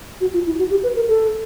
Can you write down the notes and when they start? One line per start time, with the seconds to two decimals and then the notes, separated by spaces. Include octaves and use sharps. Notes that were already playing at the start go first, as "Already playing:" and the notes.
0.21 F#4
0.33 F4
0.46 E4
0.59 F#4
0.70 G4
0.83 B4
0.96 A#4
1.08 A4